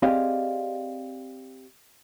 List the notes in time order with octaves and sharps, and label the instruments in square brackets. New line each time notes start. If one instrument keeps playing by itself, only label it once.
[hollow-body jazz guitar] C4 G4 G#4 D5 D#5 F5